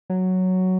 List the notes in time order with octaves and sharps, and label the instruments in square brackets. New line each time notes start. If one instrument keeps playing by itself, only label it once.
[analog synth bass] F#3